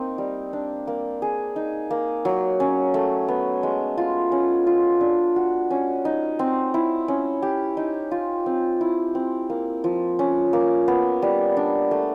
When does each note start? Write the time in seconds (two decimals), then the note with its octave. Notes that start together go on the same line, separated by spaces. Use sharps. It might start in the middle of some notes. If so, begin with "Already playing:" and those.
Already playing: A#3 C4 D#4
0.18 G3
0.53 D4
0.87 A#3
1.22 G#4
1.56 D#4
1.91 A#3
2.25 F#3
2.60 C#4
2.94 A3
3.28 B3
3.63 G#3
3.98 F4
4.32 C#4
4.67 F4
5.01 D4
5.36 F#4
5.71 C#4
6.05 D#4
6.39 C4
6.74 E4
7.08 C#4
7.42 G4
7.77 D#4
8.11 F4
8.46 C4
8.81 E4
9.15 C4
9.50 A#3
9.84 F3
10.19 C#4
10.53 A#3
10.88 B3
11.22 G3
11.57 D4
11.91 A3